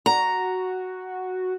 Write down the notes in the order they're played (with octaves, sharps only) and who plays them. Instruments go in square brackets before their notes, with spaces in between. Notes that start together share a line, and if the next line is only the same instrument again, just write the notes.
[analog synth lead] F#4 [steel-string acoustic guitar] A#5